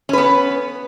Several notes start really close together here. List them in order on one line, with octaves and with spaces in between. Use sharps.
C#4 B4 B3